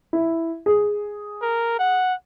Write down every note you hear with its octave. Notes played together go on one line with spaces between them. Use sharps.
E4
G#4
A#4
F#5